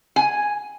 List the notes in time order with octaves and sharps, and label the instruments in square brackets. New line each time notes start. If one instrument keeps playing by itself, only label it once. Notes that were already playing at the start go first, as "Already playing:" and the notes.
[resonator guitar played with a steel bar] G#5